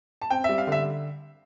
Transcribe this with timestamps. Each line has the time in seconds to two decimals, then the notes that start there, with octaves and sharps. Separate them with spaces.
0.22 A5
0.30 C4 G5
0.44 G3 E5
0.58 F5
0.67 D3 E5